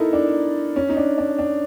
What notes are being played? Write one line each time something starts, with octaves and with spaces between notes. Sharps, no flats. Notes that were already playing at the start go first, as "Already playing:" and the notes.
Already playing: D#4 E4 A4 A#4
D4
C#4
D#4
D4
D4
D4